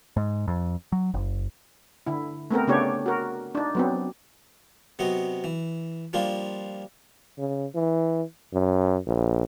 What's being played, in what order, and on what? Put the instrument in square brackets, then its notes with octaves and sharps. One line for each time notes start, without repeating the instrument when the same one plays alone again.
[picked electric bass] G#2
F2
F#3
F#1
[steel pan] D3 E4
A3 B3 C4 A#4
C#3 A3 B3 D4 G4 C#5
F#4 A#4
D4 D#4
F#3 B3 C4
[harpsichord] C3 F#3 B3 D#5
E3
F3 G3 A#3 D4 F4
[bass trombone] C#3
E3
F#2
A#1